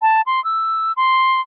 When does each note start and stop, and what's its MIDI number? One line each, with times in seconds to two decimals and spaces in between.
0.02 0.21 81
0.26 0.42 84
0.44 0.92 88
0.97 1.41 84